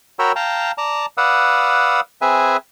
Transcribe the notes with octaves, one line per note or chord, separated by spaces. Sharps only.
F#4 A#4 C#5 G5 B5 E6
F5 G5 A5 A#5
D5 A5 A#5
B4 D5 F5 F#5 D#6 E6
C4 G#4 B4 E5 G#5